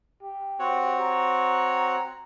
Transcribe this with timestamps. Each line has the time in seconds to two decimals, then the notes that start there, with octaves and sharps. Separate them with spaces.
0.22 G4
0.59 C4 F#4 C#5
1.00 A#5